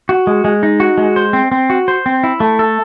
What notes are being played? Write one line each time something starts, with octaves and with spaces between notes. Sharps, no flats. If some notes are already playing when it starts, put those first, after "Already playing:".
F#4
G#3
G#3
D#4
F#4
G#3
C5
C4
C4
F#4
C5
C4
E4
A3
A4